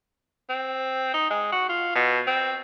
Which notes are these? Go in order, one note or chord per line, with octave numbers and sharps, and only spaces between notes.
C4
D#4
G#3
F#4
F4
B2
C4